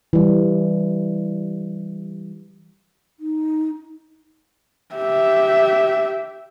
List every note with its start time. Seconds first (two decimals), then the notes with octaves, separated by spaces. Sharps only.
0.13 E3 G3
3.20 D#4
4.95 G4 E5